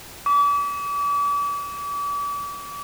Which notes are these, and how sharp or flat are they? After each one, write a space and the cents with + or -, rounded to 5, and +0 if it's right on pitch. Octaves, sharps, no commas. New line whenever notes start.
D6 -40